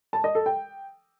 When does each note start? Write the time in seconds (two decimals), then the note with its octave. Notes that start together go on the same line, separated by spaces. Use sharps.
0.13 A5
0.24 D#5
0.35 A4
0.46 G5